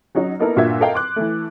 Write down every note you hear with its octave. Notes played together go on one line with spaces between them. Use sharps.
F#3 C#4 D#4 F#4
A#3 B3 D#4 E4 A4 A#4
G2 A#2 F4 F#4 E5 G#6
A4 A#4 D#5 F5 G5
C6 D6 F#6
E3 A3